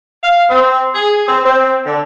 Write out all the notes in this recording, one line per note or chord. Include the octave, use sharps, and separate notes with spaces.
F5
C4
G#4
C4
C4
D3